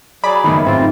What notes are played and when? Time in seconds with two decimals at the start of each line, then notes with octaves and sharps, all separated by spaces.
0.24 F#3 G#4 D5 B5
0.44 F#1 D#3 A3 B3
0.66 G#2 C4 F4